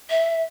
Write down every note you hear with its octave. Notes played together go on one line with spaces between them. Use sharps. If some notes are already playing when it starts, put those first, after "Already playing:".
E5